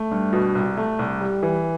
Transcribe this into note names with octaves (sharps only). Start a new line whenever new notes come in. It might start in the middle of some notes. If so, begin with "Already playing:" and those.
Already playing: A3
G2
B2
C2
A3
C2
G3
E3